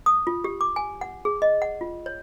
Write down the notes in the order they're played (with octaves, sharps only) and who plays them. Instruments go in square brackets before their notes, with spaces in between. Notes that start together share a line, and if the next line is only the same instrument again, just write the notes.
[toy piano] D#6
F4
G4
D6
G#5
F#5
G#4
D#5
F#5
F4
C#5